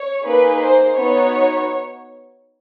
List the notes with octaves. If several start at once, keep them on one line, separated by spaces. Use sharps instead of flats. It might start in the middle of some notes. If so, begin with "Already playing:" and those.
Already playing: C#5
A#3 D#4 G#4 B4
C5
B3 D#4 F#4 C#5